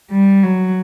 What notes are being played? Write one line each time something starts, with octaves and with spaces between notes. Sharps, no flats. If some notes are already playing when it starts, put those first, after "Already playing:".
G3
F#3